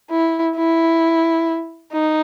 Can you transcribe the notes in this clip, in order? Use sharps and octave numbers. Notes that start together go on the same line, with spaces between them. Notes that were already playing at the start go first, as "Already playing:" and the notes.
E4
E4
D#4